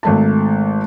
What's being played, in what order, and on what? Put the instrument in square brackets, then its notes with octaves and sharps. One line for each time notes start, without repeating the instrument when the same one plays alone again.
[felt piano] G#1 A3 A5